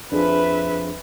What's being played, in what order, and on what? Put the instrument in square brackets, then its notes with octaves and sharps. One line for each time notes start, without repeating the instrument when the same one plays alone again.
[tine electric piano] F2 F3 [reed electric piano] D4 G#4 [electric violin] B4 E5